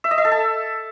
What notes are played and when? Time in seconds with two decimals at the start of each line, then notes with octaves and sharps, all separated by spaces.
0.04 E5
0.11 D#5
0.18 E5
0.25 A4
0.31 A5